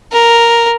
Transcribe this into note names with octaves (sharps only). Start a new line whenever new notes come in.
A#4